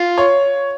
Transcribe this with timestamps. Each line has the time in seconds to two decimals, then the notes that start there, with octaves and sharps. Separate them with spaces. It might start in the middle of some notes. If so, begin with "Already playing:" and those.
Already playing: F4
0.18 C#5